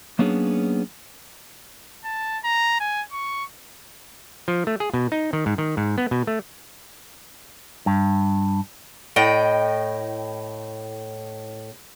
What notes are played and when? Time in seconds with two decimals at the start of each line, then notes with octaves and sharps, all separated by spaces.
0.19 F#3 A#3 B3 C#4 D4 G#4
2.05 A5
2.45 A#5
2.80 G#5
3.12 C#6
4.48 F3
4.67 A3
4.80 G#4
4.94 B2
5.12 D#4
5.33 D#3
5.46 G#2
5.58 D#3
5.77 G#2
5.98 B3
6.11 B2
6.27 A3
7.86 G2
9.16 A2 D#5 G5